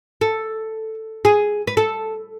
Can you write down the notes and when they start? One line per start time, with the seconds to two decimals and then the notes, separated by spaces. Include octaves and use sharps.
0.21 A4
1.25 G#4
1.67 B4
1.77 A4